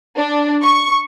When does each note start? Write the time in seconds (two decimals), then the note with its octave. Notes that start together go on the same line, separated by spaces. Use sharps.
0.17 D4
0.62 C#6